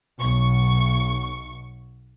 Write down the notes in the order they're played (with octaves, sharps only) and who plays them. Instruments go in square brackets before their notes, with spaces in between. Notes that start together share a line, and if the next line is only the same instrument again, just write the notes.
[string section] B1 C#6